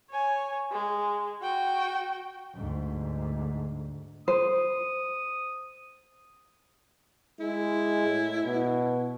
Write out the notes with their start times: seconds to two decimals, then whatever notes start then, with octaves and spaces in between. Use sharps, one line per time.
0.11 C#5 G#5
0.71 G#3
1.42 F#4 G5
2.55 D2 G#2
4.28 C5 D#6
7.40 G#3 E4
8.06 A2
8.44 B2